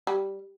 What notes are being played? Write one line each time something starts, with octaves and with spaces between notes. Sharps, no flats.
G3